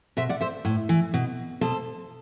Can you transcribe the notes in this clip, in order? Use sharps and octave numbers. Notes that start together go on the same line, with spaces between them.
B2 C5 E5
D5 F#5
C5 E5
A2
E3
B2
B2 A4 C5